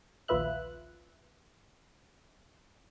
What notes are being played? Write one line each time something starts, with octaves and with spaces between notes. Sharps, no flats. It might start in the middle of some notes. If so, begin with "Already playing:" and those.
A#1 D#2 F4 B4 E5 F#6